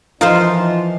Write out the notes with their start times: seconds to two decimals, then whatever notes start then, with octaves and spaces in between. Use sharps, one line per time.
0.21 E3 F3 D#4 F4 A#4 C5